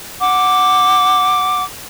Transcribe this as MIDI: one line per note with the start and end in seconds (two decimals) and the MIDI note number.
0.21 1.63 78
0.21 1.63 86